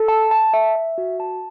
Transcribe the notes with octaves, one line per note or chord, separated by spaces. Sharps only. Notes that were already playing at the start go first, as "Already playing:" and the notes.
Already playing: A4
A5
A5
E5
E5
F#4
A5